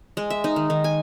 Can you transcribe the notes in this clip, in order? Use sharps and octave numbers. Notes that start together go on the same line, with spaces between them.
G#3
E5
D#4
D#3
D#3
G#5